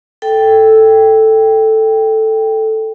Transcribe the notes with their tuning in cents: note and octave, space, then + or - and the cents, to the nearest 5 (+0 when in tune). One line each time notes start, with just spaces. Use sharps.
A4 +0 G5 +0